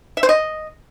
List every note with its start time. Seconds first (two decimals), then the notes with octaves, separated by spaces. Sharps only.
0.17 E5
0.23 C5
0.29 D#5